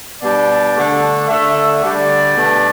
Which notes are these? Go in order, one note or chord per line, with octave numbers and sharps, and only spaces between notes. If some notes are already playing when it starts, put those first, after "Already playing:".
B2 G3 D4 D5
D3 A3 D4
D3 A3 D4 E5
D3 G3 D4 D5
B2 A3 D4